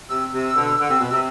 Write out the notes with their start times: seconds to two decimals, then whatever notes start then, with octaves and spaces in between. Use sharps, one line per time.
0.09 C3 E6
0.32 C3
0.56 B2 D3
0.79 D3
0.90 C3
1.00 B2
1.11 C3